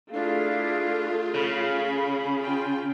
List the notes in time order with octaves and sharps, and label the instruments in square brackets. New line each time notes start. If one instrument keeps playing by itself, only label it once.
[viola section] A3 F4 G#4 [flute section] D4 E4 F5
[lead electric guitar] C#3 [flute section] B5
[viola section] F4 G5